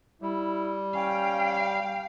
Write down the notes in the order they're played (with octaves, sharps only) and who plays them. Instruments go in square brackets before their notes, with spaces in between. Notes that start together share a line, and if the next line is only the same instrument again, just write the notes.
[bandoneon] G3 [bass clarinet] E4
[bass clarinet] C#4 [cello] F5 [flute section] G5